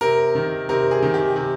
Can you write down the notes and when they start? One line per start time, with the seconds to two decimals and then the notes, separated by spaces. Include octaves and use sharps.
0.01 C3 A#4
0.35 D#3
0.69 C3 A#4
0.91 G#4
1.02 D#3
1.14 G4
1.36 C3